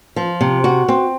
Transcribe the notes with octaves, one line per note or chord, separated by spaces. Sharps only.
F3
C3
F#4
C4